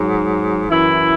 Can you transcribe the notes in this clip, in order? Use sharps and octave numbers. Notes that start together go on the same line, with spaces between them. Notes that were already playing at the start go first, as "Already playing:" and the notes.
Already playing: G#2 F#3
F#2 E3 E4